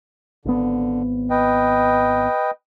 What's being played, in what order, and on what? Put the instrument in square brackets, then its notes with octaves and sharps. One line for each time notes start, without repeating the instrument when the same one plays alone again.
[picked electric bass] G#1 B3 [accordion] D3
[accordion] B4 D#5 G5